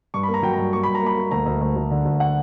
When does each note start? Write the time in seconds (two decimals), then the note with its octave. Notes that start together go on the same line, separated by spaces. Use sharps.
0.14 G2 C#6
0.23 B5
0.28 A#3
0.34 A#5
0.43 F#3 G5
0.53 A#5
0.58 G2
0.73 A#3 C#6
0.83 G2 B5
0.95 A#5
1.02 A#3 B5
1.17 A#3
1.31 D2 A#5
1.46 D2
1.61 D2
1.76 D2
1.91 D3
2.05 D2
2.20 F#5